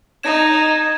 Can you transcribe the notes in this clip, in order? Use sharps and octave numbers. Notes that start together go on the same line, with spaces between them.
D#4 G#6 E7